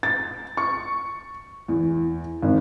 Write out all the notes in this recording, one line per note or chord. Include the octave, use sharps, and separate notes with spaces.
A6
C#6
E2
G#1